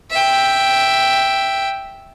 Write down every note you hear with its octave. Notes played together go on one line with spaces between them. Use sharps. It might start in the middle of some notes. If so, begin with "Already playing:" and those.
E5 G5